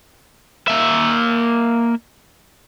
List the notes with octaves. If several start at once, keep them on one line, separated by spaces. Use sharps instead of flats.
A#3 E5